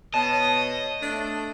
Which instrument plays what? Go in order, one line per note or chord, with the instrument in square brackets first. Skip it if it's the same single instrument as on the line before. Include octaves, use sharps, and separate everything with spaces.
[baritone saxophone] B2 [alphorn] C#5 [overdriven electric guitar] D#5 [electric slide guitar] A5
[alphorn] A3 [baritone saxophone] D4